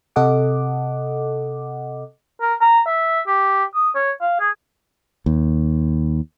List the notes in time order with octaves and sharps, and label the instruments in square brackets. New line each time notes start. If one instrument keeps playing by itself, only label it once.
[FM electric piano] C3 A4 D#5 F#5 D6
[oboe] A#4
A#5
E5
G4
D#6
C#5
F5
G#4
[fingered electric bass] D#2